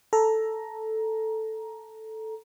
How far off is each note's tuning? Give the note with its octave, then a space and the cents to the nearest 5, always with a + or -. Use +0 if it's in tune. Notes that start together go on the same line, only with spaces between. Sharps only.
A4 +0 A#5 +10